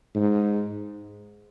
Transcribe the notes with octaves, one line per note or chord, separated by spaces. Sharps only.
G#2